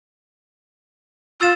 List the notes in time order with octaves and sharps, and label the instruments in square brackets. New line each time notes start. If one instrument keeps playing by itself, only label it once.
[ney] F4 [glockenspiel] E6 A6 E7